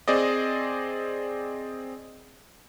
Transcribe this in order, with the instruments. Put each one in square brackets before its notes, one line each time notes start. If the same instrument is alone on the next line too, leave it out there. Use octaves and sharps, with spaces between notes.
[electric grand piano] C4 G#4 D5 D#5